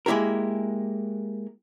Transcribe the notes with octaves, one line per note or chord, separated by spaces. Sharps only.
G#3 A#3 E4 G4 A#4